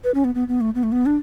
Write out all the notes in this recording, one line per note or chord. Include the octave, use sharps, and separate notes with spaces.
B4
C#4
B3
B3
B3
A3
B3
A3
B3
D4